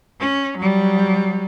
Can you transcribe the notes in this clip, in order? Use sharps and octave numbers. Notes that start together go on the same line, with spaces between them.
C#4
F#3 G3